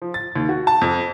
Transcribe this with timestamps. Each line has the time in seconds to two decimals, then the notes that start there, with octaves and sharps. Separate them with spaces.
0.02 F3
0.14 A6
0.36 D#2
0.49 F#4
0.67 A5
0.81 F2